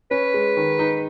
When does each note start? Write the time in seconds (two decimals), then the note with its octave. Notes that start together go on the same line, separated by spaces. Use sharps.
0.11 C#4 B4
0.34 G#3
0.57 D#3
0.79 D#4